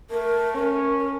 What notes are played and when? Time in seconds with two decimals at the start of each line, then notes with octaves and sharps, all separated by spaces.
0.10 A3 A#4
0.54 C#4
0.98 A#4